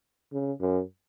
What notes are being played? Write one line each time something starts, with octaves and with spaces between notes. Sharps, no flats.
C#3
F#2